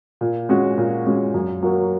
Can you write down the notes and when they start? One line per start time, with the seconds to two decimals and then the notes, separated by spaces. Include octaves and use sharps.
0.21 A#2
0.49 G#3 C#4 F#4
0.78 A#2
1.06 G#3 C#4 F#4
1.34 F#2
1.63 F#3 A#3 F#4